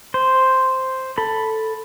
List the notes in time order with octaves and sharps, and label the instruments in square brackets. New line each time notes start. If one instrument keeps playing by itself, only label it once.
[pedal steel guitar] C5
A4 B5